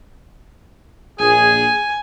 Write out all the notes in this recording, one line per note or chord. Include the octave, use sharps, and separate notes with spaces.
A#1 G#4 G#5